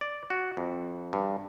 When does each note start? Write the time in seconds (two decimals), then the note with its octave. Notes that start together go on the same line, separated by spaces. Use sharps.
0.01 D5
0.30 F#4
0.57 F2
1.13 G2